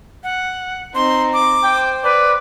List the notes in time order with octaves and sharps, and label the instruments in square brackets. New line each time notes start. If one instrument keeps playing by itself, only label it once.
[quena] F#5
[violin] C4 D#4 [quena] C6
[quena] D6
[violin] C5 [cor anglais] G5
[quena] B4 [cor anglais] D5